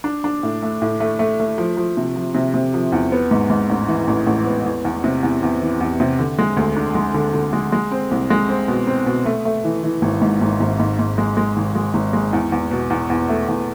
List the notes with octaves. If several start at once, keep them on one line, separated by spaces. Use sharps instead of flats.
D4
D4
A2
A3
A2
A3
A3
A3
F3
F3
C3
F3
C3
C3
F3
E2
B3
G#2
G#2
A1
E3
A1
A1
B3
E2
E2
C3
E2
E2
E3
E2
C3
D3
G#3
D2
D4
G#3
D3
D3
G#3
G#3
C4
C2
G#3
C4
B2
C4
B2
A3
A3
E3
E3
G#1
G#2
G#1
G#1
G#2
G#2
G#3
G#3
G#1
G#3
G#1
G#3
E2
E2
B2
E2
E2
A3
E2